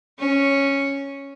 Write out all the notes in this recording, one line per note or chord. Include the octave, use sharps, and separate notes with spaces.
C#4